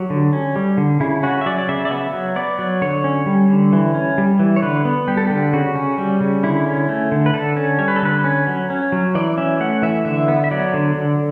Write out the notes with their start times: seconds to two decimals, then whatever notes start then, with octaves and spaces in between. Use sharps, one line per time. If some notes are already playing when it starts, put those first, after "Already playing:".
Already playing: F#3 G4
0.10 D3
0.33 C#4
0.56 G3
0.77 D3
1.00 C#3 E4
1.23 C#4 F#4
1.41 E5
1.46 F#3 D5
1.58 D5
1.69 C#3 E5
1.85 D5
1.91 B3 E5
2.14 F#3
2.36 B3 D5
2.59 F#3
2.82 D3 C#5
3.04 C#4
3.26 G3
3.49 D3
3.73 E3
3.94 C#4
4.18 G3
4.39 E3
4.56 C#5
4.62 D3 B4
4.85 B3
5.08 G3 G4
5.17 A4
5.27 D3 G4
5.53 C#3 F#4
5.76 C#4
5.98 G3
6.21 C#3
6.43 D3 E4
6.66 C#4
6.89 A3
7.12 D3
7.26 B4
7.34 D3 A4
7.57 C#4
7.79 G3 C#5
7.88 B4
7.96 A4
8.02 D3 B4
8.24 C#4
8.47 F#3
8.70 C#4
8.92 F#3
9.15 E3 D5
9.38 C#4 E5
9.60 A3 F#5
9.82 E3 E5
10.05 D3 E5
10.28 B3
10.44 E5
10.51 F#3 D5
10.74 D3
10.95 D3